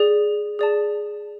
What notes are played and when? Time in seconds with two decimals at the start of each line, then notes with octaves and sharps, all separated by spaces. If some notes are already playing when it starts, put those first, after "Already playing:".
Already playing: G#4 D5
0.59 G#4 D5 A5